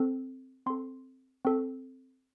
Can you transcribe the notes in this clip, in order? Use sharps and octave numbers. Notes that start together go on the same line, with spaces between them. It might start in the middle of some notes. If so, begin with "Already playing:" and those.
Already playing: C4 A4
C4 A4 C6
C4 A4